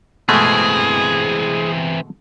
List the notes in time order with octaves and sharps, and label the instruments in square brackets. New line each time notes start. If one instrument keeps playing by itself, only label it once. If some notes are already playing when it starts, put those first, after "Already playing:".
[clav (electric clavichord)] B2 G#3 A3 [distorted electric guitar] E3 C4 [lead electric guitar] G#4